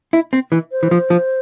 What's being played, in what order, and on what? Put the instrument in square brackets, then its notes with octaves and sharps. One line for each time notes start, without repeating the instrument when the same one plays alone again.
[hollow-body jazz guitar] E4
C4
E3
[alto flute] C5
[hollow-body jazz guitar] E3
F3
F3